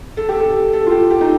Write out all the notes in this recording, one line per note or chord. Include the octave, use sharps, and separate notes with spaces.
A4
G4
A4
A4
F4
G4
G4
D#4